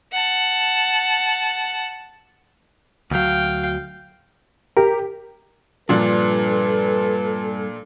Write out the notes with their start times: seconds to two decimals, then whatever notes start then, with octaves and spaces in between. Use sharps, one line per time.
0.13 F#5 A5
3.11 D2 F#3 F5 G5
4.77 G4 A#4
5.89 G2 A#2 F3 D4 A4 B4